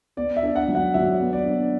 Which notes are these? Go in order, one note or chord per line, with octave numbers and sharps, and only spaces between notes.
B3 D5
E5
D4
F#5
F#3
F#5
F#3 E5
B3
D5
D4